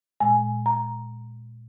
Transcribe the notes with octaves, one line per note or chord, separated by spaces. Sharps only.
A#2 G#3 G#5
A#5